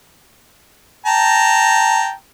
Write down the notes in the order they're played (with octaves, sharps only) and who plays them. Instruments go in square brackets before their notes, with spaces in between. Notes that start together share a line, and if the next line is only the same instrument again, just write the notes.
[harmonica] G5 A5 A#5